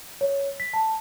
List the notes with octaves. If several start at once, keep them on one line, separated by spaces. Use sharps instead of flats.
C#5
B6
A5